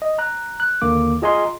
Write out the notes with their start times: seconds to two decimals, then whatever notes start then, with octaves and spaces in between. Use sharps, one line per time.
0.02 D#5
0.18 A#5 F#6
0.60 F#6
0.82 D#2 D3 A#3 D6
1.22 F4 G#4 D#5 G#5 A#5 C6